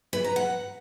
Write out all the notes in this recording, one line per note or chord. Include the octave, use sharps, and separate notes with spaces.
B4
A#5
F#5